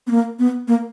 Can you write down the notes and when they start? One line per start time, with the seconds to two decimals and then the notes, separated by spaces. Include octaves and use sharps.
0.07 B3
0.11 A#3
0.39 B3
0.68 A#3